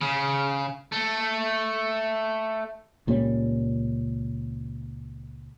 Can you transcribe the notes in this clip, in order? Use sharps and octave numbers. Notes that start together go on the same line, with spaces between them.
C#3
A3
C#2 A#2 G3 C#4